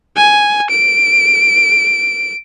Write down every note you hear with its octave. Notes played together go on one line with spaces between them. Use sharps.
G#5
D7